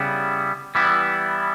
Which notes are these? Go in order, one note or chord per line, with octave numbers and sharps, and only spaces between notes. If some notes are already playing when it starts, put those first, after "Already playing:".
Already playing: C#3 G3 B3 E4
E3 G3 B3 E4